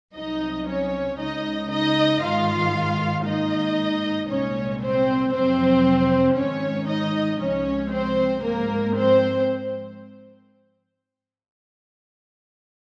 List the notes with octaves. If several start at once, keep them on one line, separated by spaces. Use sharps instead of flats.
C2 C3 F#3 D#4 D#5
C#4 C#5
C#2 C#3 G#3 D#4 D#5
D#4 D#5
G#2 D#3 G#3 F4 F5
G#2 D#3 A#3 D#4 D#5
C2 A#2 G#3 C#4 C#5
C4 C5
F2 C3 F#3 C4 C5
G#2 D#3 G#3 C#4 C#5
D#4 D#5
C2 C3 F3 G#3 C#4 C#5
C4 C5
G#2 F3 G#3 A#3 A#4
C4 C5